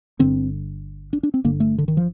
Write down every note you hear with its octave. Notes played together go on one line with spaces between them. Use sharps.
G1 G2 D3 C4
D4
D4
C4
G1 G2 D3 A#3
A3
D3
D#3
F3